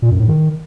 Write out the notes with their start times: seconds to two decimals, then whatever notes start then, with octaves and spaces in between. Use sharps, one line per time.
0.02 A#2
0.11 F#2
0.19 A2
0.28 D#3